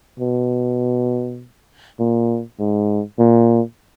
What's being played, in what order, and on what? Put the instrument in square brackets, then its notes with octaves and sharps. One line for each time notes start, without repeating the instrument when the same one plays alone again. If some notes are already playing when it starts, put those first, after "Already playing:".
[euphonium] B2
A#2
G#2
A#2